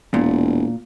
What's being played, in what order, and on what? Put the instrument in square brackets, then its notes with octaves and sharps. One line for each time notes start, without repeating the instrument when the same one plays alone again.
[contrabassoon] E1 [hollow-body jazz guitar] A#2